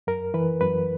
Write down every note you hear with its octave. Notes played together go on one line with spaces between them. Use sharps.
F#2 A#4
E3 B4
F#2 B4